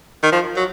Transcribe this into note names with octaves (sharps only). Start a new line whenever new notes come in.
D#3
F3
F#3